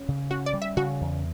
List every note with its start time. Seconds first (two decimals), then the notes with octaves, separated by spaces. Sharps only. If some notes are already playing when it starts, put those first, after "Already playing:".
Already playing: C#4
0.08 C#3
0.31 C#4 F#4
0.46 D5
0.53 G3
0.62 E5
0.77 C#3 F#4
1.01 E2